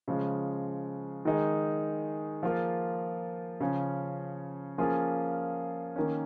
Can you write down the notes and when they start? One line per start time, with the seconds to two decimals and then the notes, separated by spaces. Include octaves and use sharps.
0.08 C#3 F3 G#3
1.25 D#3 G#3 D#4 G#4
2.43 F3 A#3 F4 G#4
3.60 C#3 F3 C#4
4.78 F3 A#3 C#4 F4 G#4
5.96 D#3 A#3 C#4